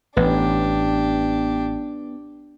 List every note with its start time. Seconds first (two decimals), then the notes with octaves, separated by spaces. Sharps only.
0.17 A1 B3 D4 G4